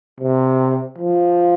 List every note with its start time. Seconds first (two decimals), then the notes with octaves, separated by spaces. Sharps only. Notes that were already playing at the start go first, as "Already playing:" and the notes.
0.20 C3
0.98 F3